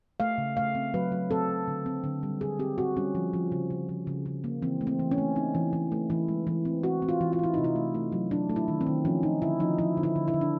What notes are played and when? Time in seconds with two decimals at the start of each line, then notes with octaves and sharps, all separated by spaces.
0.20 A3 F5
0.38 C#3
0.57 A3 F5
0.75 C4
0.94 F#3 B4
1.12 F#3
1.31 C4 A4
1.49 F#3
1.68 D3
1.86 C4
2.04 D3
2.23 G3
2.41 C4 G#4
2.59 C4 G4
2.78 C4 F#4
2.97 G3 C#4
3.15 F3
3.33 F3
3.52 C#3
3.70 C#3
3.89 F3
4.07 C#3
4.26 C#3
4.44 A#3
4.62 E3 C4
4.81 A3
4.87 C4
4.99 E3
5.11 C#4
5.18 A3
5.36 C4 D#4
5.55 E3
5.73 E3
5.92 A3
6.10 E3 E4
6.28 G#3
6.47 E3
6.65 C4
6.83 C4 F#4
7.02 C4
7.09 F4
7.21 E3
7.33 F4
7.39 E3 E4
7.54 C3 D#4
7.64 E4
7.76 A3
7.94 A3
8.12 F#3
8.31 F#3 D4
8.50 A3
8.56 E4
8.68 D#3
8.81 C4
8.87 D#3
9.05 F3 C#4
9.23 F3 D#4
9.42 D3 E4
9.60 F3 D#4
9.78 F3 E4
9.97 D3
10.03 E4
10.16 D3
10.28 E4
10.34 D3
10.41 D4